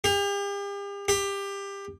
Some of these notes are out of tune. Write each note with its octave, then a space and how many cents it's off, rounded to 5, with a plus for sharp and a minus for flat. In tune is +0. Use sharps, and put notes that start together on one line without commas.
G4 +40
G4 +20